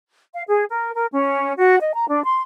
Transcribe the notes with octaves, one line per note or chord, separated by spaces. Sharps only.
F5
G#4
A#4
A#4
C#4
F#4
D#5
A#5
D4
C6